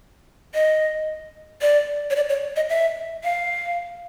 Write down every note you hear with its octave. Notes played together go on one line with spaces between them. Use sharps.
D#5
D5
C#5
D5
C#5
D#5
E5
F5